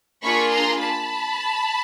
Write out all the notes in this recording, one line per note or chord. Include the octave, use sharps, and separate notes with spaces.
A#3 D4 F4 G#4 B5 C#6
A#5 C6
A5 B5